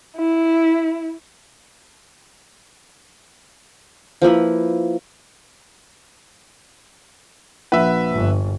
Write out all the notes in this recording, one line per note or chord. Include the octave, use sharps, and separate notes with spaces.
E4
F3 A#3 E4 B4
A#1 F3 B4 E5 F#5
G1